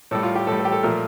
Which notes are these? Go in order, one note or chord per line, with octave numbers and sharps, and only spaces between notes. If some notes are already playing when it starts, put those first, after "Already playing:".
A2 G3 A4
F4
G4
A2 G3 A4
A4
G4
A4
A#2 F3 A3 A#4